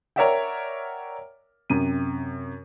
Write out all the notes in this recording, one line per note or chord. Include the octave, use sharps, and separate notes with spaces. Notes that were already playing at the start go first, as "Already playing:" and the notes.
A#4 C#5 D5 E5 F#5 G5
F#2 C3 D#7